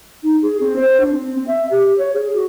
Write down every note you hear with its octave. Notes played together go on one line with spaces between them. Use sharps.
D#4
G#4
C4
C5
D4
C4
C4
E5
G4
C#5
G#4
F#4